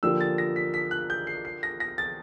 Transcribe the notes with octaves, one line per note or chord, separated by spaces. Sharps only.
D3 F3 A#3 D4 G4 E6
A6
A#6
B6
B6
F#6
G6
C7
C7
A#6
A#6
A6